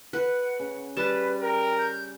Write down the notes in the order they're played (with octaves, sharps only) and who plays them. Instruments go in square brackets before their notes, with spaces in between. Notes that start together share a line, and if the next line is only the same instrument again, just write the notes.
[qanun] B4 [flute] F#5
[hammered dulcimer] C#3
[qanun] G3 A5 [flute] B4
[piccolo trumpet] A#4 [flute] G5
[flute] G6